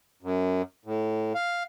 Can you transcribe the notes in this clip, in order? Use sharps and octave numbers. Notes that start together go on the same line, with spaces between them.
F#2
A2
F5